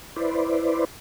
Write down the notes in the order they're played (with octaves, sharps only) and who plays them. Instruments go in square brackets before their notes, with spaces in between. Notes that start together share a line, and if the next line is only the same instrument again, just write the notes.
[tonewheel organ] E4 B4 C5 D5